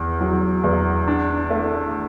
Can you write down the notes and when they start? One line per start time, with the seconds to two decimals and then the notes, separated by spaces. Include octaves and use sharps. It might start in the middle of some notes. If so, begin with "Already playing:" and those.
Already playing: E2
0.21 F#3
0.64 E2
1.08 D4
1.50 A3